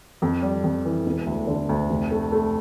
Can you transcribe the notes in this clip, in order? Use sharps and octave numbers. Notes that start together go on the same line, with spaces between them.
F2
G3
F2
E3
E1
D2
D3
D2
F1
A3
A3